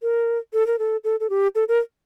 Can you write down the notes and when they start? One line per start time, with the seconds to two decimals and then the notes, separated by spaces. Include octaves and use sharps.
0.02 A#4
0.53 A4
0.67 A#4
0.79 A4
1.04 A4
1.20 A4
1.30 G4
1.55 A4
1.68 A#4